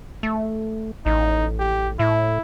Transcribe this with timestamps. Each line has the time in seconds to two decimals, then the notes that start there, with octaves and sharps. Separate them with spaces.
0.23 A3
1.06 A1 D#4
1.60 G4
1.99 A2 E4